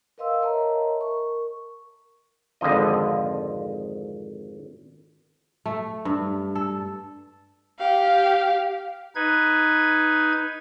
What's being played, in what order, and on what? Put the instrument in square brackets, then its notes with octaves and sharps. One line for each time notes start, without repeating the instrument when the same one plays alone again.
[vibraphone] A#4 B4 D#5 F5 C6 E6
A#4 C#5 D#5 E5 A5 A#5
A#4 C#6
[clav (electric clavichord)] G#1 F2 D3 F3 D#5
[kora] A3
G2
A4
[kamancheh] G4 F5
[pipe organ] D#4 B4 G#6